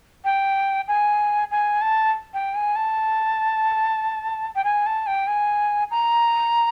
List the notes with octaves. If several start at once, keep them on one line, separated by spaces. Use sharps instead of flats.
G5
G#5
G#5
A5
G5
G#5
A5
G5
G#5
A5
G5
G#5
A#5